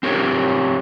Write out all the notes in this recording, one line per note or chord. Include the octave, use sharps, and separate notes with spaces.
C4 G4 A#4 C#5